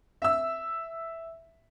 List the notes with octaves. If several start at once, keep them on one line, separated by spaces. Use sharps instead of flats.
E5 E6